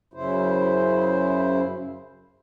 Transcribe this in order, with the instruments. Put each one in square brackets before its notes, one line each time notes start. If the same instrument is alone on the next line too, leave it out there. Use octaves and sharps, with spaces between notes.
[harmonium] F#2 C#3 E4 C5